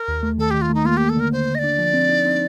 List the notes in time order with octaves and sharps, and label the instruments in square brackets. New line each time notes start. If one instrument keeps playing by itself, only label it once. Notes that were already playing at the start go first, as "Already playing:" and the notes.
Already playing: [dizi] A#4
[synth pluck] D#2
A3
[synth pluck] D#3 [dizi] A4
[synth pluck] D#3 [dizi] G4
[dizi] F4
[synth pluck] A3 [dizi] D#4
[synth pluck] A#3 [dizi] F4
[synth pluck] A#3 [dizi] G4
[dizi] A4
[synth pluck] D3 [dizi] A#4
[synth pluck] D3 [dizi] C5
[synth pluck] D3
[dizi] D#5
[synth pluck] D4 [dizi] D5
[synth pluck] F3
C4
D#4
C4